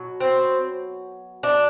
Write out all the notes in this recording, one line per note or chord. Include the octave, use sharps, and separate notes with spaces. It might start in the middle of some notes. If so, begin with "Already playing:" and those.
Already playing: B2 F#3
C4
D4